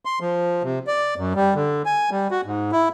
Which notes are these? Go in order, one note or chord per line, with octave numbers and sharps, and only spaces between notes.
C6
F3
C3
D5
F#2
G3
D3
G#5
G3
F#4
G#2
E4